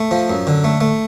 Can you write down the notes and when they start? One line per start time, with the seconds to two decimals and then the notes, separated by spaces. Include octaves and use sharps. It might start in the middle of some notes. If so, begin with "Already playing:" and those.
Already playing: A3
0.11 F3
0.30 F#2
0.47 D3
0.64 A3
0.81 A3